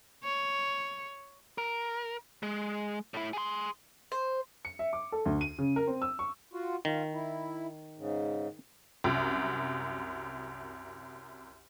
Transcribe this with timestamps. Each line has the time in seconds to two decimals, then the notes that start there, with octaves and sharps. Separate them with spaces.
0.24 C#5
1.58 A#4
2.43 G#3
3.14 A2 E4
3.33 G#4 C6
4.12 C5
4.65 C#7
4.79 E5
4.93 D6
5.12 A4
5.26 D2
5.41 D#7
5.59 C#3
5.76 A#4
5.87 C4
6.02 E6
6.19 C#6
6.53 F4 F#4
6.85 D#3 F4
7.14 E4
7.98 G#2 C#3
9.04 C2 F#2